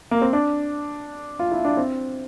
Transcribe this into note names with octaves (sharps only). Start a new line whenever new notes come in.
A#3
C4
D4
F4
E4
D4
C4